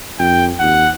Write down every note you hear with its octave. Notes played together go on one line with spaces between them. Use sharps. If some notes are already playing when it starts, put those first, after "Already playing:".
F2 G5
D#2 F#5